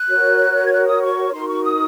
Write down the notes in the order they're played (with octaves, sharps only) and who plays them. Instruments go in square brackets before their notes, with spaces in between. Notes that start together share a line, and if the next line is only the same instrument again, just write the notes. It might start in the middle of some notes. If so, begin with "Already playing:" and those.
Already playing: [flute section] F#6
F#4 A#4 C#5
G#6
F#6
D#6
C#6
D#4 F#4 A#4 C6
C#6
D#6